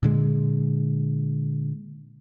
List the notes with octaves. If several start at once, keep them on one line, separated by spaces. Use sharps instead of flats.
A#2 D3 G#3